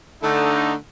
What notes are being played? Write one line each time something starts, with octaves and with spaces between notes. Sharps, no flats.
D3 A3 D#4